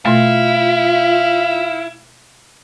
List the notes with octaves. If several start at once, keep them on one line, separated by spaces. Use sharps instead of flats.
B2 A3 E4 F4 F5